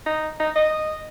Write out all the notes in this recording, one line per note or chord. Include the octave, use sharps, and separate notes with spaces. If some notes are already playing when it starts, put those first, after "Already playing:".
D#4
D#4
D#5